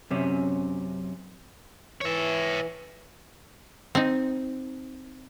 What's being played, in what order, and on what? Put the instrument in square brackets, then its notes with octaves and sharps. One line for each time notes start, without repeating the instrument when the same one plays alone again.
[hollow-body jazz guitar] F#2 C3 C#4
[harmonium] E3 [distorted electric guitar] C#5 E5
[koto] C4 D#4